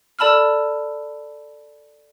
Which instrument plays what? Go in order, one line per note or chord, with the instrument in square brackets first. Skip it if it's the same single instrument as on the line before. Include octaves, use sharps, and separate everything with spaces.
[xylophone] A4 D5 A5 B5 E6 F6